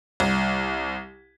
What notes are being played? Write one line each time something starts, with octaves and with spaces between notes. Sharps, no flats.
C2